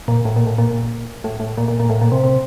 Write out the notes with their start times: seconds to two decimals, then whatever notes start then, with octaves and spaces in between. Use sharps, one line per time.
0.08 A#2
0.25 A2
0.36 A#2
0.47 A2
0.58 A#2
1.24 A2
1.40 A2
1.58 A#2
1.68 A#2
1.80 A#2
1.89 A2
2.01 A#2
2.12 C3
2.24 C3